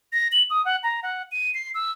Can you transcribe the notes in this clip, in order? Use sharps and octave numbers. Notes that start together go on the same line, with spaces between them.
A#6
F#7
D#6
F#5
A#5
F#5
D#7
C7
E6